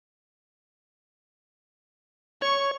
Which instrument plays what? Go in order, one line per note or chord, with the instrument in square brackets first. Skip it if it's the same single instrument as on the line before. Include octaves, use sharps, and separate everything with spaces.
[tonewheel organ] C#5 [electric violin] C#6